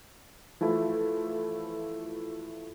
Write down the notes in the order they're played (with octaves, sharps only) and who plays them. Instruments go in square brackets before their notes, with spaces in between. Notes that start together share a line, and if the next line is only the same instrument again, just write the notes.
[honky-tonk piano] E3 F3 A3 E4